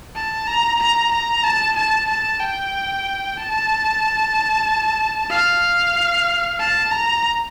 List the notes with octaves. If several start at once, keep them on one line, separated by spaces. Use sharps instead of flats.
A5
A#5
A#5
A#5
A5
A5
A5
G5
A5
F5
A5
A#5